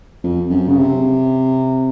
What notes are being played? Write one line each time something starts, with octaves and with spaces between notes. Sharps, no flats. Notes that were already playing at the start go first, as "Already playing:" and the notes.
F2
F#2
C#3
C3